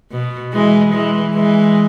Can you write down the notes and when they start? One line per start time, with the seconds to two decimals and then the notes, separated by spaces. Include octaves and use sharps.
0.11 B2
0.53 E3 G#3
0.93 E3 G#3
1.34 E3 G#3